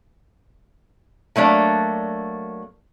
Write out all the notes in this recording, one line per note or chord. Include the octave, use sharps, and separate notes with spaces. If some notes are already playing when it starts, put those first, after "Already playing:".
F#3 A3 A#3 D4